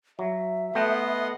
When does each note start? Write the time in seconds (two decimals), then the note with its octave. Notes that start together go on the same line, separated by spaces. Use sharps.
0.19 F#3 E5
0.75 A3 B3 D#5 F#5 G5 C6